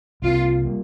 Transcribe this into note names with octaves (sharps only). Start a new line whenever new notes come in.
C2 C3 G3 A#3 F4
G3 A#3